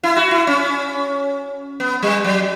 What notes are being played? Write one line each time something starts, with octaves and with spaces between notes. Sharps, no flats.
E4
F#4
E4
C#4
B3
G3
F#3